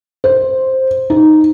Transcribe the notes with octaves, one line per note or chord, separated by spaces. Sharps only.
C5
D#4